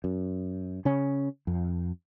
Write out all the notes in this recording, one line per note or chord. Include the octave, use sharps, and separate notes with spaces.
F#2
C#3 C#4
F2